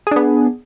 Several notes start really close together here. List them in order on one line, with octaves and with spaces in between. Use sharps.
G#4 D4 B3